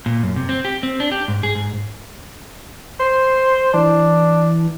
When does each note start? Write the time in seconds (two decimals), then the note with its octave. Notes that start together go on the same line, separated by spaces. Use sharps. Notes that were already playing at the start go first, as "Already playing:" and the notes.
0.06 A#2
0.23 F#2
0.36 C3
0.49 C4
0.65 G4
0.83 C4
1.00 D4
1.12 G4
1.28 G#2
1.43 G#4
1.55 G#2
3.00 C5 C7
3.74 E3 D4